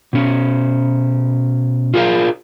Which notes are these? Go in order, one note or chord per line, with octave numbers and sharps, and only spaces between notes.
B2 C#4
F4 G#4 A#4 F5